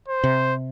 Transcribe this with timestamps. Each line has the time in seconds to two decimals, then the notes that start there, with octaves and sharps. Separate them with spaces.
0.08 C5
0.24 C3